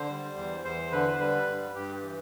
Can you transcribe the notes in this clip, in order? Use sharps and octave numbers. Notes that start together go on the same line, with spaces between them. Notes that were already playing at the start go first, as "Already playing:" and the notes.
Already playing: D3 C5
G3
E2
E2 C5
D3 B4
C5
G3 B4
G2
G2 G4
E3